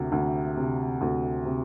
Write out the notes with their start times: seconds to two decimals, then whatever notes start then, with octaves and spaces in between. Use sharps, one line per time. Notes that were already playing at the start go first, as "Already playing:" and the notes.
Already playing: D2 C3
0.12 D2
0.57 C3
1.01 D2
1.45 C3